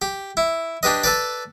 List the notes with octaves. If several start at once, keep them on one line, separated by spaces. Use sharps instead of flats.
G4
E4
D4 G4 B4 D#5
A4 B4 D5